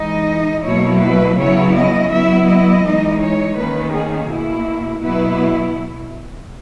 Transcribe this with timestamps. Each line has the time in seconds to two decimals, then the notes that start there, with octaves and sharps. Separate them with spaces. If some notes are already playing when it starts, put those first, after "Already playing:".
Already playing: E3 G#3 D#4 D#5
0.64 B2 F#3 A#3 E4 C#5
1.01 B4
1.37 C#3 F#3 B3 E4 C#5
1.75 D#5
2.10 F#3 B3 E4 E5
2.47 D#5
2.84 E3 G#3 D#4
3.20 C#5
3.56 D#3 A#3 C#4 B4
3.92 G#4
4.29 B2 A#3 E4
5.02 B2 F#3 B3 E4 B4